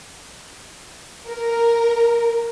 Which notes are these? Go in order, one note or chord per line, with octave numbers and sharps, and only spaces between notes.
A#4